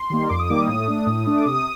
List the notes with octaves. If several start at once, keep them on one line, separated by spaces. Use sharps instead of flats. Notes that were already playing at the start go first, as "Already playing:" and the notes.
Already playing: C6
D#3 G3 A#3
F2 D6
D#6
D#3 G3 A#3 D6
D#6
A2
A3 D4
A2
A3 D4
D6
C3 D#6